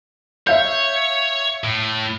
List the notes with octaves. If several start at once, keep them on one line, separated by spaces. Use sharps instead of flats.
C#5 E5 F5 G6
A2